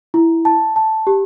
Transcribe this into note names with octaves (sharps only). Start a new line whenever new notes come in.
E4
A5
A5
G4